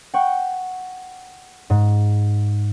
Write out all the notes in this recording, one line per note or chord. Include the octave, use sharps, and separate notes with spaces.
F#5 G5 C#6
G#2